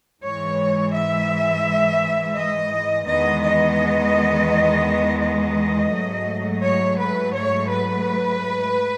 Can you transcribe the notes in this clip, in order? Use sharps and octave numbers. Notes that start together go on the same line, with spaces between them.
G#2 E3 G#3 C#5
E5
D#5
E2 D#3 G#3 B3 D#5
D#5
D#5
G#2 F#3 A3
C#5
B4
C#5
B4